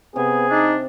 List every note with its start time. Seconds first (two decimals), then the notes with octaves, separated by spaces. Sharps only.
0.16 C3 B3 G#4
0.51 D4 D#4